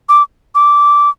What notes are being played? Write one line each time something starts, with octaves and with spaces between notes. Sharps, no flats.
D6
D6